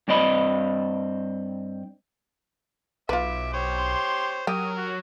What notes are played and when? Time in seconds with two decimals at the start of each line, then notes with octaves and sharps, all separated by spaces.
0.08 G2 C4 D5 D#5 B5
3.09 B1 F4 B4 E5 D6
3.54 G4 C5 C#5
3.78 C6
4.47 F#3 G4 A#4 D#6
4.77 F#4